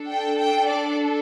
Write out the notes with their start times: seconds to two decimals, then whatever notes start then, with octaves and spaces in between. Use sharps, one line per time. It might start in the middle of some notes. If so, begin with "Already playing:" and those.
Already playing: D4 A4
0.12 G5
0.40 G5
0.69 D5